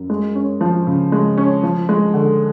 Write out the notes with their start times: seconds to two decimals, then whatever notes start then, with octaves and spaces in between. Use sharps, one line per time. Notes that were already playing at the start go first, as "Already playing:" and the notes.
Already playing: F#2
0.10 G#3
0.35 C#4
0.61 F3
0.87 C#3
1.12 G#3
1.38 C#4
1.63 F3
1.89 G#3
2.14 D3